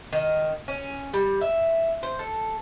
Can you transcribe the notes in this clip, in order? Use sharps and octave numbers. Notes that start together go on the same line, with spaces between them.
D#3
C#4
G3
E5
C5
A4